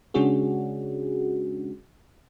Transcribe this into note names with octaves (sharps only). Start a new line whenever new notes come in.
C#3 G#3 C#4 D4 F#4 G#4